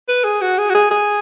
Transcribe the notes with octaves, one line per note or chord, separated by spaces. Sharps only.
B4
G#4
F#4
G#4
F#4
G#4
G#4